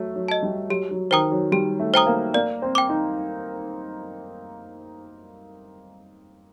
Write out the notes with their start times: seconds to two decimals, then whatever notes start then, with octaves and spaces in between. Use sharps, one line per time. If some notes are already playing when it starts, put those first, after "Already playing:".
Already playing: F#3 A3
0.16 F#3
0.28 D#5 A5
0.43 G3
0.69 F#3 G4
0.91 F#3
1.11 D#3 C5 G5 A#5 D#6
1.32 F#3
1.52 G3 G4
1.80 A3
1.94 C5 G5 A#5 D#6
2.07 A#3
2.34 A#3 D5
2.62 C4
2.75 G5 D6
2.89 D#4